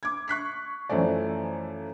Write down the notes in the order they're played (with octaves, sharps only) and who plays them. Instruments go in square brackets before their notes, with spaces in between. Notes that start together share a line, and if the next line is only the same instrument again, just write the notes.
[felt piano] D6 G#6
C#6 F#6 B6 C7
F#2 E3 F3 A3 D5